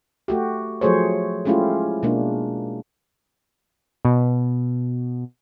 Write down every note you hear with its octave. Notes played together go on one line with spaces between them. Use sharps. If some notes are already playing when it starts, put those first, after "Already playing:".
A3 F#4 G4
F3 F#3 A3 G#4 C5 C#5
G#3 A3 C#4 E4 F4 G4
B2 G#3 A#3 D4
B2